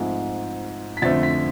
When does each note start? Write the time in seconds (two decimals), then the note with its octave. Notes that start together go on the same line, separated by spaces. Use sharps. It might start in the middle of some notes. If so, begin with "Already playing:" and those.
Already playing: G#2 F3 A3 C4
0.97 B6
1.02 F2 D3 A3 C4 A6
1.23 B6